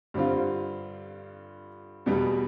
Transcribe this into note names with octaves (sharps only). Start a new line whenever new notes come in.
G2 D3 G3 C4 F4
E2 B2 G3 B3